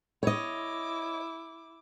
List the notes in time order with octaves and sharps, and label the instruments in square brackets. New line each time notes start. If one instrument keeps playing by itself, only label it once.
[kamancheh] E4 D6 [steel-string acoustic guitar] C#5 D#5